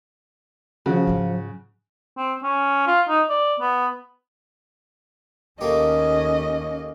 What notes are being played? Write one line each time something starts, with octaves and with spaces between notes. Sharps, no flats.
C#3 F3 F#4
G#2 F#3
C4
C#4
F4
D#4
D5
B3
D#2 A3 A#3 C#4 G4 D#5